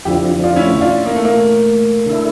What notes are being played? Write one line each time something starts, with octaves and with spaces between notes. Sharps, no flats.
F2 D3 F3 E4 G4
D4 F4
C#4 E4
D4 F4
A#3
A3
A#3
D3 A3 E4